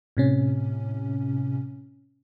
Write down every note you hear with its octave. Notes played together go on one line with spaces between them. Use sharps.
A2 C3 C#4